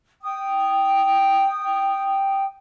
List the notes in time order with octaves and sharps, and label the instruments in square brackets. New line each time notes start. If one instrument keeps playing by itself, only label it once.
[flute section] G5 D#6